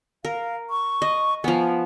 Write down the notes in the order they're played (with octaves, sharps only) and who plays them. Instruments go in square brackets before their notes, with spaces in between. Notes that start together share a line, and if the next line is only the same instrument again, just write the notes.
[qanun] A#4 [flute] F5
[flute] C#6
[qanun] D#5
[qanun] F3 B3 [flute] G#5